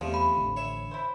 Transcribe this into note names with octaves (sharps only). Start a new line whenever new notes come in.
E2 C3 F3 G3 A3
B5
A1 D3
C#5 E5
E4 C5